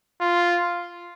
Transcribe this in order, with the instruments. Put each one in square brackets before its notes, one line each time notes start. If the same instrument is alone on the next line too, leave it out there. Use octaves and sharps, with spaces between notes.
[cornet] F4